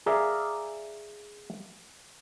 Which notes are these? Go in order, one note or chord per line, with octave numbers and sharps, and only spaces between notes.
G#4 A#4 D5 E5 F5